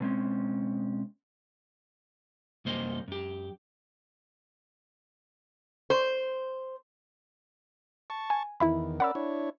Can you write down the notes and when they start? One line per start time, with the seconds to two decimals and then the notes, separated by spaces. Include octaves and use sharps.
0.01 B2 G#3 C4 C#4
2.65 C2 F#2 A#3 C5 D#5
3.08 F#2 G4
5.90 C5
8.10 A5 C#6
8.30 G#5
8.60 E2 D#3 E4 E5 B5
9.00 C#4 A#4 D5 F#5 B5 E6
9.15 D4 E4 C#5